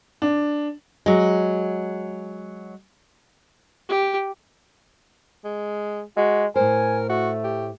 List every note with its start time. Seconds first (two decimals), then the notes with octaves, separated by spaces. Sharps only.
0.22 D4
1.06 F#3 G#3
3.89 G4
5.44 G#3
6.17 G#3 F#4
6.56 A2 A#4 C5 G#5
7.10 A3 F#4
7.44 G4